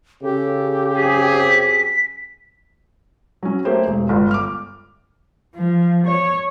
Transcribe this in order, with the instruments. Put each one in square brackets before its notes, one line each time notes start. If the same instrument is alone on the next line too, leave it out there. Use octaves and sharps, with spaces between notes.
[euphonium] C#3 [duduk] G4 [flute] A4
[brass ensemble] F#2 C4 G#4 [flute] B6
[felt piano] F#3 C#4
A3 A#3 G4 C5
E1
G1 C#2
D6 F6
[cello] F3
C#5